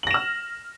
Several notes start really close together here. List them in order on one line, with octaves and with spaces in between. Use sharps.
F#7 A#6 E7 F6